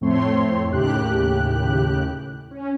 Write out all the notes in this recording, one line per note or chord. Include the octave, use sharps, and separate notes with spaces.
F2 A2 A3 C4 C#5 C6
D#2 A2 C#3 G4 F#6
C#4